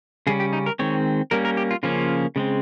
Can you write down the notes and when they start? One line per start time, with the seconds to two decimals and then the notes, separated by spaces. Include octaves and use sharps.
0.27 C#3 G3 C#4 G#4
0.40 G4
0.53 D#4
0.66 A#4
0.79 D#3 G#3 C4 C#5
1.31 G3 A#3 C#4 A#4
1.45 A#4
1.57 G4
1.71 F4
1.83 C#3 F3 A#3 C#4 F4
2.36 C#3 G#3 C4